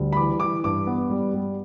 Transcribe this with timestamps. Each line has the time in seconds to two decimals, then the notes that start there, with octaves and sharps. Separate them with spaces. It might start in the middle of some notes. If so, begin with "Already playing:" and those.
Already playing: D2 G3
0.12 B5
0.16 E3 D6
0.40 E3 D6
0.64 G2 D6
0.87 B3
1.10 G3
1.34 G3